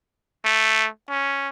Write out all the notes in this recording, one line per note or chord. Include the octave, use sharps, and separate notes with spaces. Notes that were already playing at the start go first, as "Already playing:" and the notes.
A3
C#4